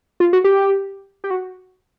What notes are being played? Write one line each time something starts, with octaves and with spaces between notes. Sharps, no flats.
F4
F#4
G4
G4
F#4